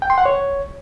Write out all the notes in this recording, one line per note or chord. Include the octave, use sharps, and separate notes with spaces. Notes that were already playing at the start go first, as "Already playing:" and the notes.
G5
C6
F#5
C#5